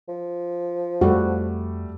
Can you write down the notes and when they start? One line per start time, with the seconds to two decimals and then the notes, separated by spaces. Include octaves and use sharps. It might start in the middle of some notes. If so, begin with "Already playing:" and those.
0.08 F3
1.01 F2 G3 A3 F#4